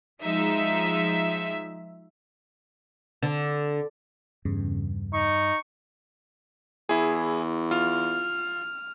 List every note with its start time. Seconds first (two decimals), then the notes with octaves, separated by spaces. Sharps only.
0.22 F3 G#3 D#4 E5
3.22 D3
4.45 E2 G2 C#3
5.13 D#4 C#6
6.89 E2 E4 G#4
7.71 F4 F6